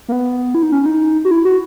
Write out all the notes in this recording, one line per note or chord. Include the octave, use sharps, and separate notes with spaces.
A#3
B3
E4
D#4
C#4
C#4
D#4
F#4
E4
F#4